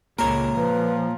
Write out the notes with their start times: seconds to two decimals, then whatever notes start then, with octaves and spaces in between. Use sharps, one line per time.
0.19 C#2 A#2 A#4 C#5
0.56 F3 B4